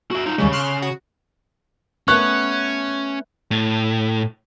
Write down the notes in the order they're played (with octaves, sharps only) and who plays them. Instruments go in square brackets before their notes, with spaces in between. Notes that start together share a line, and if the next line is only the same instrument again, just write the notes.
[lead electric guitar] F#4 E5
D#4 F4
[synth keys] D#2 G3 G#3 [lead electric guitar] C#3
[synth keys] C6 F6 F#6
F#4
[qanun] A3 B3 F#5 [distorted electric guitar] C#4 [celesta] C#6 [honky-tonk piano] F#6
[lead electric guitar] A2